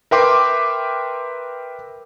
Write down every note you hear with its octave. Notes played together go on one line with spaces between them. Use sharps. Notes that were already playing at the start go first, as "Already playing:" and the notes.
A#4 B4 E5 G5 C6 D6